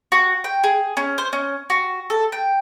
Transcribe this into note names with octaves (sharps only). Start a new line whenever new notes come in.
F#4
G5
G#4
C#4
C5
C#4
F#4
A4
G5